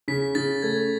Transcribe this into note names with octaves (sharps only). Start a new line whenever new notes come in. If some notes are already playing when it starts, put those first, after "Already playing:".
C#3 B6
C#3 A6
A3 G#6